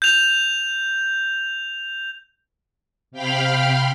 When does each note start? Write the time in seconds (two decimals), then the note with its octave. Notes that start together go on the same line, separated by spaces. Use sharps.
0.02 G6 F7
3.11 C3 F5 G5 B5 F6